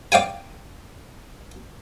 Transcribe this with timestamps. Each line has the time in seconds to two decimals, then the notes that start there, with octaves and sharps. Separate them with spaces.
0.12 D5 F5 G5 G#5